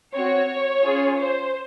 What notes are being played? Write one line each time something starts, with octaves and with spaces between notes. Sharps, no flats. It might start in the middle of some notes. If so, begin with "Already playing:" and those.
C4 F#4 C#5
C#4 F4 G#4
C5